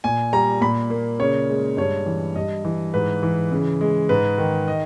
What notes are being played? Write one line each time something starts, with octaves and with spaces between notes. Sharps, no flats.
A#2 G#5
G3 A#5
A#2 B5
A#3
C#3 C#5
G#3
G2 C#5
E3
G2 D#5
E3
G#2 B4
E3
C#3
G#3
G#2 B4
D#3
D#5